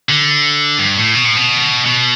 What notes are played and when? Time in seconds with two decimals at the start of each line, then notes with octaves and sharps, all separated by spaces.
0.09 D3
0.79 G2
0.97 A2
1.15 B2
1.25 A2
1.36 B2
1.85 B2